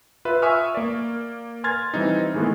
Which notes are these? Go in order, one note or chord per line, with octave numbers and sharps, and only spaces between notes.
F4 B4 E5
E5 G#5 C#6 D#6 F6
A#3 D5
G#5 C6 F6 G#6 A6
E3 G3 C4 D#4
D#3 E3 G#3 A3 B3